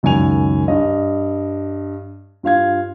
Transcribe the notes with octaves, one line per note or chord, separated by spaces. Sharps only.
C#2 F#2 D#3 G#5 F7
G2 D#5
G2 F4 F5 G#6